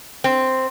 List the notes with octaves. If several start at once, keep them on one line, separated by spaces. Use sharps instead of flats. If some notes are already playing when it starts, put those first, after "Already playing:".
C4